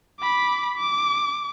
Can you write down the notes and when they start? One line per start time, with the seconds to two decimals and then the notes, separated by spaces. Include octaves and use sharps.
0.20 B5 D6
0.77 D6